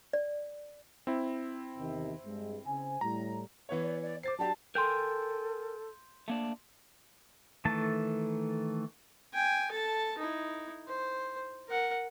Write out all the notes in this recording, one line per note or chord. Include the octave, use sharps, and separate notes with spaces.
D5
C4 E4
E2 C3 D#3
G2 G#3
C#3 C5 G#5
A2 G3 A#5
E3 B3 C#5
D5
D5
C5 D6 A6 C7
F#3 D4 G4 A5
A4 A#4 G5 G#5 C6 G6
A3 A#3 D4
D#3 E3 A3 A4 A5
G5 G#5
A4 A5
D#4 E4
C5
A#4 F#5